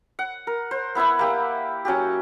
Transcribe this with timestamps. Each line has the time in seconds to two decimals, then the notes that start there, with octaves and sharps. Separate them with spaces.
0.19 F#5
0.47 A#4
0.71 C5
0.95 B3 E4 B4 E5
1.19 A#3 G4 F#5
1.85 F#3 C#4 F#4 G4